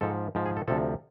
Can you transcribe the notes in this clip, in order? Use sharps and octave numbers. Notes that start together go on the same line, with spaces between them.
G#2 F3 A4
G#2 F3
G#4
A4
D2 C3 F3 A4